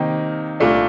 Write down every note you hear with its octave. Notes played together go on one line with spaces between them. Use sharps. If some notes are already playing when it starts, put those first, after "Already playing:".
Already playing: C3 D#3 A#3 D#4
C2 A#2 A3 D4